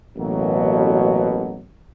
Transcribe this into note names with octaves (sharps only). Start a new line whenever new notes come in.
A1 B2 F#3 A#3